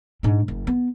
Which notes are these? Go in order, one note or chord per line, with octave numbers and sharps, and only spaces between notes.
G#2 D4
F#1
B3